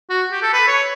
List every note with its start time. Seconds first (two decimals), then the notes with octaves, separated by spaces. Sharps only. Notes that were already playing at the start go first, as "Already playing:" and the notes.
0.10 F#4
0.32 G4
0.42 A4
0.53 B4
0.68 C#5